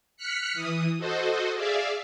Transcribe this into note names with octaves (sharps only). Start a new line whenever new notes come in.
F6 F#6 B6 C#7
E3 D#6
F#4 A4 C5 D#5
G#4 D5 E5 F5